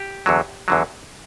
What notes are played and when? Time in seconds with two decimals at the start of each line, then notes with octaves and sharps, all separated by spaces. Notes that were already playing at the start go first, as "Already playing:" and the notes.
Already playing: G4
0.26 E2 D3 F#3
0.68 E2 D3 F#3